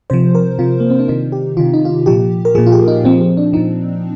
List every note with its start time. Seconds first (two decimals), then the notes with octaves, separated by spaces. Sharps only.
0.10 C3 F3 C5
0.35 A#4
0.59 C3 F3 F4
0.80 A#3
0.90 C4
0.99 D4
1.08 C3 D#3 D#4
1.32 G4
1.57 C3 D#3 F4
1.73 D#4
1.85 F4
1.90 D#4
2.06 A#2 F3 G4
2.45 A#4
2.55 A#2 F3 G#4
2.66 F4
2.72 G4
2.88 D#4
3.04 A#2 F3 C4
3.21 C4
3.37 D4
3.53 A#2 F3 D#4